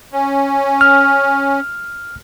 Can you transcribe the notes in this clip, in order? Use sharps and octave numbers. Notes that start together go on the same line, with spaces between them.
C#4
F6